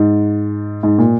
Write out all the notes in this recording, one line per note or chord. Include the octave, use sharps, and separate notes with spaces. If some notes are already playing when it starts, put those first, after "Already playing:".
Already playing: G#2
G#2
A#2